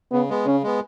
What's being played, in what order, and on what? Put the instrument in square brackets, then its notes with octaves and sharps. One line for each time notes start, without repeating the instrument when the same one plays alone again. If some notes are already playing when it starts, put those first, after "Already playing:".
[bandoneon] C#3 [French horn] B3
[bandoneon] G#3 B3
[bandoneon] C#3 [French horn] C#4
[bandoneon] G#3 B3